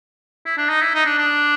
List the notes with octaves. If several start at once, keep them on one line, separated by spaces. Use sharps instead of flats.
E4
D4
D#4
E4
D#4
D4
D4